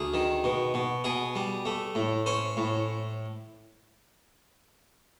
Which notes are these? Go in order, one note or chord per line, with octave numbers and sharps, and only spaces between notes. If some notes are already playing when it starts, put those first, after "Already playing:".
Already playing: D2 G#4
D#3
B2
B2
B2 G#4
G3
A3
A2
C#4 C5
A2